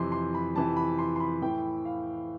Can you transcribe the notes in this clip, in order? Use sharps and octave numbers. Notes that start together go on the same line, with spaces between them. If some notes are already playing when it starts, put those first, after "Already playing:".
Already playing: F2 C3 E3 C6
C6
B5
F2 C3 E3 A5
B5
C6
C6
B5
A2 E3 G5
F5